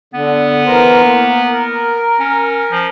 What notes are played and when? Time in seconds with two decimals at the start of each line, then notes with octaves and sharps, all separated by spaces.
0.14 D3 B3
0.66 E3 A#4 C5
1.02 A#3
1.52 A#4
2.19 C#4
2.72 F3